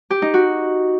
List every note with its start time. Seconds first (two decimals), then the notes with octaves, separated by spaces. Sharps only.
0.10 G4
0.22 D#4
0.34 F#4